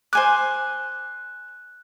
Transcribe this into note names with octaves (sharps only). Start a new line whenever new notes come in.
C5 G#5 D6 F#6